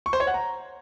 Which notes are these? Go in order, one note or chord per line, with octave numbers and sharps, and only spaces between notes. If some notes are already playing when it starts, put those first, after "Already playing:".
C#6
C5
C#5
F#5
A#5